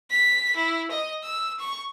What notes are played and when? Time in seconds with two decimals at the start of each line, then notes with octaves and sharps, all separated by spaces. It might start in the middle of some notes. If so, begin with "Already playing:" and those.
0.10 B6
0.56 E4
0.91 D#5
1.23 E6
1.59 C#6